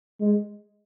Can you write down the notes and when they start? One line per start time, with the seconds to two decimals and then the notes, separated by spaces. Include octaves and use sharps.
0.21 G#3